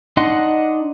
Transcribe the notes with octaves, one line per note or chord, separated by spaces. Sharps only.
D4 D#4 D#5 F#5 C6